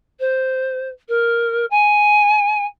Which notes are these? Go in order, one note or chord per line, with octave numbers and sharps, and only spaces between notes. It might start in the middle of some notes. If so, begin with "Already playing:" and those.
C5
A#4
G#5